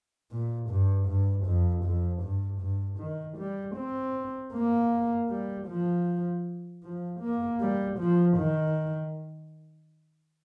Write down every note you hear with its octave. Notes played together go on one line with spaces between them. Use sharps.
A#2
G2
G2
F2
F2
G2
G2
D#3
G3
C4
A#3
G3
F3
F3
A#3
G3
F3
D#3